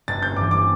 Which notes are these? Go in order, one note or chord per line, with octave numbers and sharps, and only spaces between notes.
G1 A6
G6
G2 E3 D6
D6